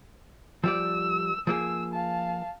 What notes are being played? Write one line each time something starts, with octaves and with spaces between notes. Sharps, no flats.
F3 G3 D5 E6
F3 A#3 G#4 E6
F5 A5